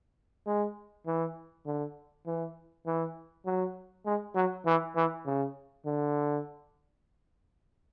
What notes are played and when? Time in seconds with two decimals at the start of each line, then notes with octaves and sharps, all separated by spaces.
0.47 G#3
1.06 E3
1.66 D3
2.26 E3
2.86 E3
3.46 F#3
4.06 G#3
4.35 F#3
4.66 E3
4.96 E3
5.26 C#3
5.85 D3